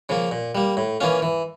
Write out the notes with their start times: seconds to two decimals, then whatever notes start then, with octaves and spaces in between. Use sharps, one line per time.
0.09 C#3 F3 A#3
0.31 A#2
0.55 G3 A#3
0.77 A2
1.00 E3 A#3 C#4 F4
1.22 E3